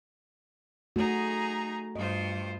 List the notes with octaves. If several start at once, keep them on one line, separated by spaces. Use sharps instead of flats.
A3 D#4 F#4 G#4 A#5
G2 F4 C5 D#5